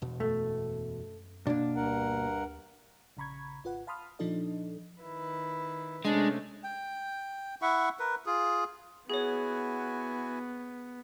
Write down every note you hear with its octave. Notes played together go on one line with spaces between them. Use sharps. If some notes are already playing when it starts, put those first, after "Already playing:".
E1 B2
F#2 A3
B2 A#3 D4
D2 G2 A#4 F#5
A#1 C#3 A#5 B5 C#6 G#6
G#1 F4 B4 F#5
F5 A5 B5 C6 D#6 F6
A#2 F3 D4 D#4 A4 D#5
D#3 E4 B4
C3 G#3 A3 C#4 D4
G5
E4 E5 F#5 C#6
A#4 B4
F4 G#4
B3 E4 F#4 G#4 C#5 G#5